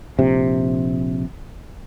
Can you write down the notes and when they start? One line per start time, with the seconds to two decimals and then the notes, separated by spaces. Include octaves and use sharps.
0.19 A#1 C3